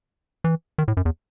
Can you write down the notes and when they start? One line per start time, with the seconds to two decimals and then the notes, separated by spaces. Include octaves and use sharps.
0.44 E3
0.78 D#3
0.88 A2
0.97 F#2
1.05 E2